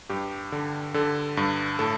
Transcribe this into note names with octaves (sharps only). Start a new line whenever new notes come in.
G2 G4
D3
D3 A4
G2
A2 A4